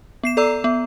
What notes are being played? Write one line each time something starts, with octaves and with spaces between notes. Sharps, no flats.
B3 C7 E7
A4 D5 A#5 E6
B3